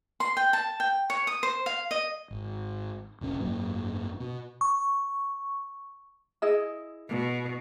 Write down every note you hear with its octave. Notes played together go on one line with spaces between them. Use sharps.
C6
G5
A5
G5
C#5
D#6
C5
F5
D#5
G#1
F1 A#1 C#4
G#1 F#2 F#3 A#3
B2
C#6
E4 G#4 D#5
B2